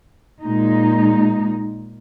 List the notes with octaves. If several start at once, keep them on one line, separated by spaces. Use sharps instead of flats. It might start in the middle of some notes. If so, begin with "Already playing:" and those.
A#2 G#3 D#4